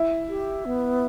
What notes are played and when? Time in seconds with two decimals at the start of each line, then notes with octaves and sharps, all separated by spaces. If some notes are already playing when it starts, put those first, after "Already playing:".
Already playing: E4
0.29 G4
0.65 B3